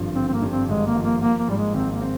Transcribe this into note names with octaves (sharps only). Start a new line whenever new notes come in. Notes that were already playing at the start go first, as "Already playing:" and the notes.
Already playing: G#1 G2 D3 F3
D3 C4
C4
A#3
G2
C4
G#1 G#3
A#3
F3
A#3
F3 A#3
A#3
G#2 G3
G#3
G#1 C4
A#3
C4